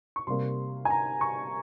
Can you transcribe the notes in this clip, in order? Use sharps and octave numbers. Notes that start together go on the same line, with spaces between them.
C#6
C3 G3 A#3 C6
G#5
A#5
C#6